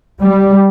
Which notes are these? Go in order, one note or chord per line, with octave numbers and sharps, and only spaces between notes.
G3